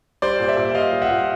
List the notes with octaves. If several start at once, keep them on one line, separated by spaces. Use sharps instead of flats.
G3 C5 D5
A#2
D5 E5
A#2
G3 D#5 F5
G3
E5 F#5
A#2